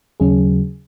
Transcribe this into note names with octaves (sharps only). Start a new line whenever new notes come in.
D#2 C#3 F#3 C#4 G#4